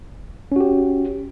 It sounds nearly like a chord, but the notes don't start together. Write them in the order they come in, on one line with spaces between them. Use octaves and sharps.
C#4 F#4 G4